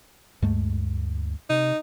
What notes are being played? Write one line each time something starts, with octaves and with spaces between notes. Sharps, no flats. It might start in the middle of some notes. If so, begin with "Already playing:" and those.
D2 G2 G#3 A3
C3 D#4